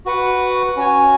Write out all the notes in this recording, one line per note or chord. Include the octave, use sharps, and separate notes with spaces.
F#4 B4 F#5
C#4 F#4 C#5 G#5